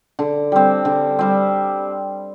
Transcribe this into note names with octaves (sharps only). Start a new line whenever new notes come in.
D3
G3 C4
D3
G3 C4